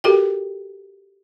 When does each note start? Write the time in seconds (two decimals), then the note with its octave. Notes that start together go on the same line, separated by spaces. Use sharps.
0.04 F#4 G4 A4 A#4 G5